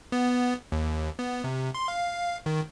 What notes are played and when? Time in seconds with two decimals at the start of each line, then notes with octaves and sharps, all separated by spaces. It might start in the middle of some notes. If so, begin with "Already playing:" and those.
0.12 B3
0.72 D#2
1.19 B3
1.44 C3
1.75 C6
1.88 F5
2.46 D#3